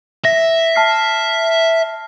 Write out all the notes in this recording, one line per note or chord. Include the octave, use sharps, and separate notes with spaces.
E5 A#6
A5 F6 C7